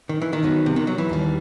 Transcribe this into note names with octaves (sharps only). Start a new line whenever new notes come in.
D#3
E3
D#3
F#3 B3 D#4 F#4 B4
C3
D#3
F#3
E3
D#2 D#3 G3